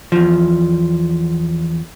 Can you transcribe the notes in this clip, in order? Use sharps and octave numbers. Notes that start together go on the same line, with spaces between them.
E2 F3